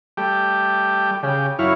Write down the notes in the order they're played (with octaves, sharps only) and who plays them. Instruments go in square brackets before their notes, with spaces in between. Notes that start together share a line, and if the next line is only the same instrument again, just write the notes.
[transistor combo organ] G3 A3 G4
[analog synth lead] C#3 [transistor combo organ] G4
[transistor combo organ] F#2 C#5 F5 [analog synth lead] E4